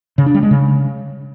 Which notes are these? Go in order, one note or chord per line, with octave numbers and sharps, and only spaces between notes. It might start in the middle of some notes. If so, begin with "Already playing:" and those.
C#3
D4
G3
G#3
C#3